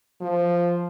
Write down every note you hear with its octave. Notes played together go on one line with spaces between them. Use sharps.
F3